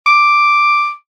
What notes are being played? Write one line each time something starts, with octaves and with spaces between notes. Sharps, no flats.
D6